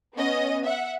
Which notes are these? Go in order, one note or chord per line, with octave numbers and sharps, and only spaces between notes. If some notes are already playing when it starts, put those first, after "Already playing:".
B3 C#4 D#5
E5 F#5